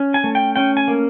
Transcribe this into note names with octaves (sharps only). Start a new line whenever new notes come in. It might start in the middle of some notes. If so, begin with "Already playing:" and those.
Already playing: C#4
G#5
A3
G5
C#4 G5
G#5
A#3